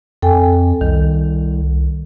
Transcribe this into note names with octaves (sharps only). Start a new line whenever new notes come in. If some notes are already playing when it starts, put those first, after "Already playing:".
F2 A4 G5 G#5
C2 D#3